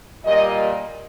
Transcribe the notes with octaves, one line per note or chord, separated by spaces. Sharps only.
A#2 G3 A#3 D#5